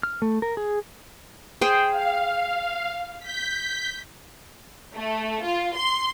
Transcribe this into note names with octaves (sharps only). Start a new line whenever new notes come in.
F6
A3
A#4
G#4
G#4 C5 G5
F5
G6 B6
A3
F4
C6